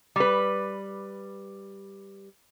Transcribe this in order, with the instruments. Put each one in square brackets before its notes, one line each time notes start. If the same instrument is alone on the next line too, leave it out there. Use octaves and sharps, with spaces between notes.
[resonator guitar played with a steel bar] G3 B4